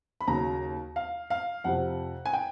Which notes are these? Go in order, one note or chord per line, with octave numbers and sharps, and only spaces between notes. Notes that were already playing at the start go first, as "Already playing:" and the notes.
B5
D#2 C#3 F#3 A#5
F5
F5
F2 C3 F3 F#5
G#5
G5